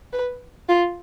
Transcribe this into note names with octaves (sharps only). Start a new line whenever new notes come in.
B4
F4